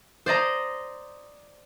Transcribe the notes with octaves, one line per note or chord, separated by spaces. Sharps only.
C5 D5 D#5 A#5